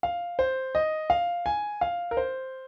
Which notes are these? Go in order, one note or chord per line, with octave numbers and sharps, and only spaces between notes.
F5
C5
D#5
F5
G#5
F5
A#4
C5